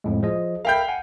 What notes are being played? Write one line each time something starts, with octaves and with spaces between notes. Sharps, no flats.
F2 A2 G#3
F3 G#4 D#5
A#4 E5 F5 G5 B5 G6
F#5 G#5